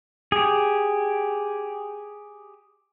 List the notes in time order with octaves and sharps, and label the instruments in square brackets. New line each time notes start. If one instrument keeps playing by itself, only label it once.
[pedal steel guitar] G4 G#4